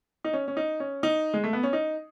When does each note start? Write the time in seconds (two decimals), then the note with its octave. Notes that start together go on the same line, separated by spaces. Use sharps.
0.24 D#4
0.33 C#4
0.48 C#4
0.57 D#4
0.80 C#4
1.03 D#4
1.34 G#3
1.44 A3
1.53 B3
1.63 C#4
1.73 D#4